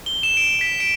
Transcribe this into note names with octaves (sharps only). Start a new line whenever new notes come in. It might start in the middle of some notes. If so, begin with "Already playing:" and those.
G7
E7
D7
B6
D7